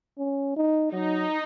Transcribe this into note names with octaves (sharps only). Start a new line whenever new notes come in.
C#4
D#4
F#3 D#4